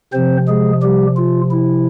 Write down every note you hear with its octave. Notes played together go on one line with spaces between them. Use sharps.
C3 F3 C4 C5
G#3 G#4
G3 G4
F4
E4